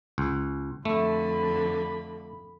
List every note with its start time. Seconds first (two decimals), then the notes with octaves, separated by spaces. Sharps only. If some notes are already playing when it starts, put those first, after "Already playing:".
0.18 C#2
0.85 F2 D3 A3 B5